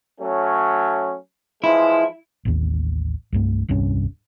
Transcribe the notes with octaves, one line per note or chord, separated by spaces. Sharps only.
F#3 A3 C#4
E3 F3 G#3 E4
A1 D#2
C2 G2 A3
D#1 C2 G2 C#4